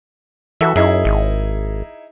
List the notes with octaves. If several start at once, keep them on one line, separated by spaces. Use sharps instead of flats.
E3 F#4 A4 E5
F#2 D#4 E4 G#4
G#1